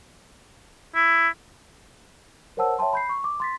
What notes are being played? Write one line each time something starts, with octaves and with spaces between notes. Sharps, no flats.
E4
A#4 C5 C#5 F#5 A5 E6
C#5 E5 G5 A5 C6
B5 G6 C7
C#6
D6
C6 A6 B6